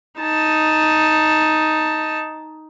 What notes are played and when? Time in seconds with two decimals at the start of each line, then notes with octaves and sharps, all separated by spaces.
0.20 D#4 A5